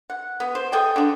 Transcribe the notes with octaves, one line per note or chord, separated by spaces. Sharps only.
F#5
B3
C5
A4 D#5 G5 G#5
D3 D4